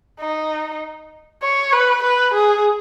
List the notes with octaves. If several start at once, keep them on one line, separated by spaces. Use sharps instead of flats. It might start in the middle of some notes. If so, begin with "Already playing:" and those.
D#4
C#5
B4
B4
G#4